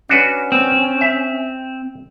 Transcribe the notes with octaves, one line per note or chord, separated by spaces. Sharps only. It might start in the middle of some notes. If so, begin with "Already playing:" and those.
C#4 D4 F#4 B4
C4
E5